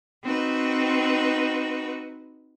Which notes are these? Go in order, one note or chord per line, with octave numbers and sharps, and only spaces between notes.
C4 D#4 F#4 B4